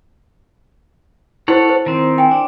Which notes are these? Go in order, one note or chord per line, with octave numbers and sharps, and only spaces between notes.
E4 F#4 A4 C5 C#5 F#5
C5
D#3 C4
G5 G#5
D4